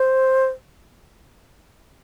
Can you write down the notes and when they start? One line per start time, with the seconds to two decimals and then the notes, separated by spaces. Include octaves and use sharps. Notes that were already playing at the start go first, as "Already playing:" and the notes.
Already playing: C5